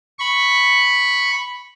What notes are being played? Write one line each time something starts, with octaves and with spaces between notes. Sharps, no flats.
B5 C#6